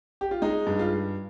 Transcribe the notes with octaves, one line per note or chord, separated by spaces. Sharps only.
G4
F4
G#3 D#4
G2
F4